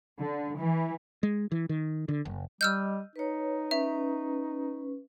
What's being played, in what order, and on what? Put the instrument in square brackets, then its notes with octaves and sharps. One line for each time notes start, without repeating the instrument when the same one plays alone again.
[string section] D3
E3
[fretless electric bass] G#3
E3
D#3
D3
F#1
[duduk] G3 [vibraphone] D#5 [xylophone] E6 F6 G6
[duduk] D#4 [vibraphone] B4 C#5
[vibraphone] C#4 B4 [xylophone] E5